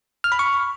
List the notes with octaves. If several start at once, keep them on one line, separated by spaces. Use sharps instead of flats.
F6
B5
C#6